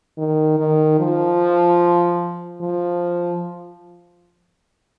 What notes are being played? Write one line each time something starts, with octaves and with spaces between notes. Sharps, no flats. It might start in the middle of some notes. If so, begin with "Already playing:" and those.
D#3
D#3
F3
F3